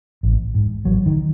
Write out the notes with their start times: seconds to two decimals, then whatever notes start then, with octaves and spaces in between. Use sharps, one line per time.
0.23 A1
0.54 G#2
0.84 A1 F#3
1.06 D#3